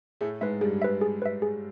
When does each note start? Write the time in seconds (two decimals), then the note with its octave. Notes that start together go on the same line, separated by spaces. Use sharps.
0.21 A2 A3 G#4
0.41 G#2 G#3 B4 E5
0.61 G2 G3 G#4
0.82 B4 E5
1.01 G#4
1.22 B4 E5
1.42 G#4